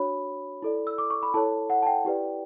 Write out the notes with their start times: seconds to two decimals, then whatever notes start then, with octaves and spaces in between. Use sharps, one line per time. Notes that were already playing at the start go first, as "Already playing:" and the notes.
Already playing: D4 F#4 C#5 B5
0.62 E4 A4 D5
0.87 E6
0.98 D6
1.10 C#6
1.23 B5
1.34 E4 A4 C#5 A5
1.70 F#5
1.83 A5
1.86 G5
2.05 E4 G4 B4 D5